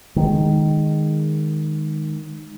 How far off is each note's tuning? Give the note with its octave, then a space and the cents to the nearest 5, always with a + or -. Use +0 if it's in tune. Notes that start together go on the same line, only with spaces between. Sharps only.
D#3 -10 G#3 +0